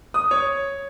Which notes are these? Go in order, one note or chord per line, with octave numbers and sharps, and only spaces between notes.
D#6
C#5